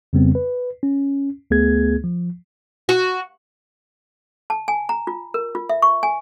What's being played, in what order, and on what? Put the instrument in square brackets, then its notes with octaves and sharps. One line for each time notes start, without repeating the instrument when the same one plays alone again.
[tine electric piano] F2 C#3 G3 B3 C4
B4
C#4
D2 A3 B3 G#4 G#6
F3
[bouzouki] F#4
[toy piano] A5
G#5
A#5
F4
A#4
F4
E5
C#6
G#5